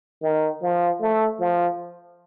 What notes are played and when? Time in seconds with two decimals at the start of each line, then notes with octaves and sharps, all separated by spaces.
0.22 D#3
0.62 F3
1.01 A3
1.40 F3